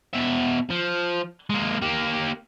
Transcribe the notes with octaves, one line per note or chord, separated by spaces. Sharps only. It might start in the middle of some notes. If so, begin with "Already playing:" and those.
B2 E5
F3
G#3 A#3
A#3 G4